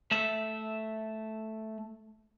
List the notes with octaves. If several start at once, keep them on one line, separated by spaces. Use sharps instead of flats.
A3 E5